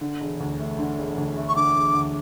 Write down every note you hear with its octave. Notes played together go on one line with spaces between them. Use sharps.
D3
E1
D2
A3
D3
E1
D2
A3
C#6
D3 D6
E1
D2